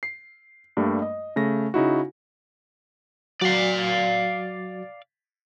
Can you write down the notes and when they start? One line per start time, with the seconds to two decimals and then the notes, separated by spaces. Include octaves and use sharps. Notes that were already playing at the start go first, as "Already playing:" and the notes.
0.03 C7
0.77 G2 G3 A3 A#3
1.02 D#5
1.36 C#3 A3 A#6
1.74 C#3 D#4 E4 F#4
3.41 F#3 F#4 D5 F5